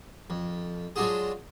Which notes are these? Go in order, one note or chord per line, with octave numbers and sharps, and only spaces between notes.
F2
F#3 G#3 D4 F4 F#4 G#4